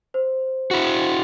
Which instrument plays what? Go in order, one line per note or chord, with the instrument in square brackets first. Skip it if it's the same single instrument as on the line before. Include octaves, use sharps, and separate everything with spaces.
[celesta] C5
[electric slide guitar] E4 F#4